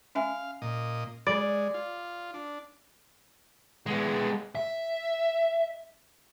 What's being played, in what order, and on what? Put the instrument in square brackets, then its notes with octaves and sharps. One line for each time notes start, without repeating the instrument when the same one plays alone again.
[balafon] C#4 E5 G#5 [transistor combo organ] F5
[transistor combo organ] A#2 D#5
[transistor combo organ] G#3 [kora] D5 [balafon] B5
[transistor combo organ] F4
D4
[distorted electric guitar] G#3 B3
E5